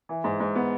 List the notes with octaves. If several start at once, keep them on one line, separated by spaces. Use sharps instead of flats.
E3
G#2
G#2
B3